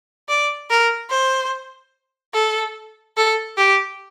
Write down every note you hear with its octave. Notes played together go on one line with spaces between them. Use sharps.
D5
A#4
C5
A4
A4
G4